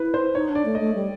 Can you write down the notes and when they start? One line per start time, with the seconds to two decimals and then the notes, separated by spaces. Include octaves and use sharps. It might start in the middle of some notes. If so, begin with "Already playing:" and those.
Already playing: E4 B4
0.14 C5
0.35 D#4 C#5
0.49 D4
0.55 D5
0.65 A3
0.75 D#5
0.80 A3
0.95 G3